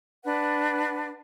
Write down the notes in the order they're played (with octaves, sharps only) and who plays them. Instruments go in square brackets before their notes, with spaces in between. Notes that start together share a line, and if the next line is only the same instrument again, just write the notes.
[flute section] D4 B4 F#5